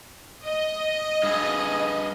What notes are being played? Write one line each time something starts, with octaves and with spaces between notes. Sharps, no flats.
D#5
G2 G#4